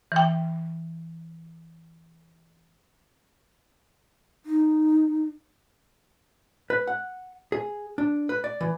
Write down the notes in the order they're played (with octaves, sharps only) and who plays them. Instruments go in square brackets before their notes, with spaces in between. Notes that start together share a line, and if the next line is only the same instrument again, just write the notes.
[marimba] E3 G5
[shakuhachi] D#4
[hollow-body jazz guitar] B4
F#5
G#4
D4
B4
D5
E3